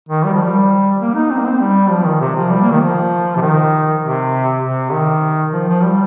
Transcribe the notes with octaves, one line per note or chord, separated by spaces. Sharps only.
D#3
G3
F3
G3
A#3
D#4
C4
A#3
C4
G3
F3
D#3
C3
F3
G3
A#3
D#3
F3
C3
D#3
C3
C3
D#3
F3
F3
G3